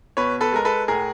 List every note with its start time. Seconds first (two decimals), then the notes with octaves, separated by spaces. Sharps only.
0.17 B2 B4 C#5
0.41 A4 B4
0.53 G#3 A#4
0.65 A4 B4
0.88 A2 G#4 A#4